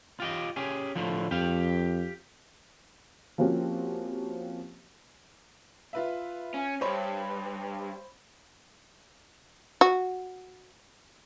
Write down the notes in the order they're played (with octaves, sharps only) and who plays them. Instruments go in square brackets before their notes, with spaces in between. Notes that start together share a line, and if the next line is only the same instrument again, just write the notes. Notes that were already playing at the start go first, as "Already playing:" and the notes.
[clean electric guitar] F4 G4 D#5
C#4 G4 G#4
A2 D3 F3
[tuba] F2 [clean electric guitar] G4 F5
[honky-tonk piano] F3 A#3 C4 C#4 F#4 G4
[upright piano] F4 B4 E5
[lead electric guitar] C#4
[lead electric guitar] D2 G2 [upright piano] C5 C#5 B5
[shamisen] F#4